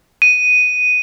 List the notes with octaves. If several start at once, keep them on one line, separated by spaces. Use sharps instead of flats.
D#7